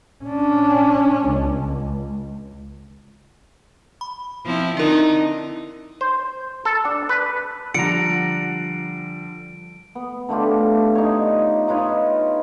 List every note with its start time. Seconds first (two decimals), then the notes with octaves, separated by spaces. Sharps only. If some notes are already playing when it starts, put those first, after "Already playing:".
0.25 C#4 D4
1.29 C#2
4.01 B5
4.45 F3 C4 E4
4.77 D3 D#4 E4 A#4
6.01 C5
6.65 A4
6.85 D4
7.09 B4
7.74 D3 F3 G3 F#5 A#5 D7
9.95 B3
10.29 D3 A3 F4 G4
10.95 D#4 C#5
11.68 D#4 F4 B4 C#5